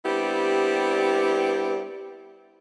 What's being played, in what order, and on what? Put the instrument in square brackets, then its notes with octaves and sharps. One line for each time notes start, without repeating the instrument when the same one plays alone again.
[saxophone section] G3 B3 C4 D4 E4 G4